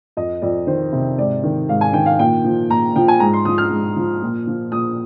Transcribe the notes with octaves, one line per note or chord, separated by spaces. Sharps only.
F2 D#5
F2 D5
D#3 C5
C3
G#2 D5
D#3
G#2 F5
G#5
D#3 G5
F5
A#2 G5
F3
A#2 A#5
F3 G5
G#5
G#2 A#5
C6
F3 D#6
F6
G#2
F3
A#2
F3
A#2 D#6